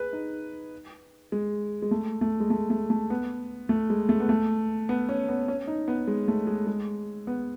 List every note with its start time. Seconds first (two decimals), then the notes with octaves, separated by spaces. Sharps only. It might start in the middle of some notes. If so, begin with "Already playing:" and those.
Already playing: G#4 B4
0.13 D#4
1.32 G#3
1.82 G#3
1.91 A3
2.21 A3
2.40 G#3
2.50 A3
2.70 A3
2.90 A3
3.10 B3
3.69 A3
3.90 G#3
4.09 A3
4.20 B3
4.29 A3
4.89 B3
5.09 C#4
5.28 B3
5.48 C#4
5.67 D#4
5.88 B3
6.08 G#3
6.28 A3
6.47 G#3
6.67 G#3
7.27 B3